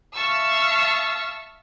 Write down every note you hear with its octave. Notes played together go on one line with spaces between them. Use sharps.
E5 F5 A5 C#6 E6